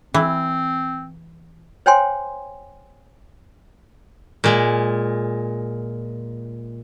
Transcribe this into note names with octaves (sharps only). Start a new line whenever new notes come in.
E3 C4
C5 C#5 G5 G#5 C6
A#2 G#3